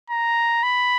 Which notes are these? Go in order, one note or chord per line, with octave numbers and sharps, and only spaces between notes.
A#5
B5